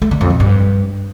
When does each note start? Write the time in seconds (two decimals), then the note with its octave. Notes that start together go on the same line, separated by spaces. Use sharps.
0.02 A3
0.11 D3
0.21 F2
0.30 B2
0.40 G2